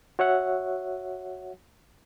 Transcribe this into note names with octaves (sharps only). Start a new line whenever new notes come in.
F#4 C#5 E5 F#5